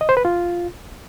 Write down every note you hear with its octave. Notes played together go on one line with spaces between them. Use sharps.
D#5
C5
B4
F4